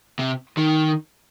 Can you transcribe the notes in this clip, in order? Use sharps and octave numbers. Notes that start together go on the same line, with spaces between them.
C3
D#3